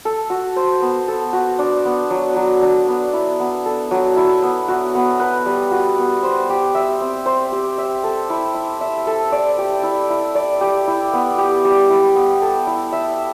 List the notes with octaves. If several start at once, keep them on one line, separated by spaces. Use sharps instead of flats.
A4
F#4
C5
B3
A4
F#4
D4
B3
F#3
F#3
D4
B3
E4
B3
A4
F#3
E4
B3
F#4
B3
B4
G3
F#4
B3
C5
G4
E5
C4
C5
G4
E5
A4
E4
E4
E5
A4
D5
G4
E4
E4
D5
G4
E4
B3
G4
G3
E4
B3
A4
E4
E5